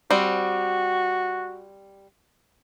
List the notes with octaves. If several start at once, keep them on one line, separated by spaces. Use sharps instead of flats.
G3 C4 F#4